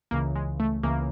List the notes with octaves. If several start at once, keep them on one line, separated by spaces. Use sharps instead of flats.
C#2 C#3 E3 A#3
G#3
A3
C#2 C#3 E3 A#3